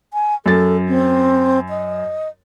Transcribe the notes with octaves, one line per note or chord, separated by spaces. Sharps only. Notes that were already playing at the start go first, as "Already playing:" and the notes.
G#5
F#2 A4 A6
C4
D#5